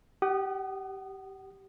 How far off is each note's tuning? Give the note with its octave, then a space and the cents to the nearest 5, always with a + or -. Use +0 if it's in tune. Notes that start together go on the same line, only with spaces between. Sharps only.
G4 -15 F#5 +35 D#6 -20